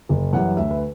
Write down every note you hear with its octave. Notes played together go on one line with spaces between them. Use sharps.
F#1
F#2 E3 G3 F#5
D2 E5
B4